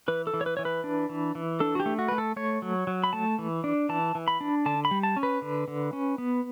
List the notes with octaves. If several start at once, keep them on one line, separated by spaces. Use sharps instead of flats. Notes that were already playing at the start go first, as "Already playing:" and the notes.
E3 B4
A4
E3
C#5
B4
E3 C#5
B4
D4
E3
E3
D4 A4
F#4
G4
A3
F#4
A3 B4
A4
A3 C#5
F#3
F#3
B5
A3 A5
E3
D4
E3 A5
E3
B5
D4
D3 A5
B5
G3
A5
C#4
B4
D3
D3
C#4
B3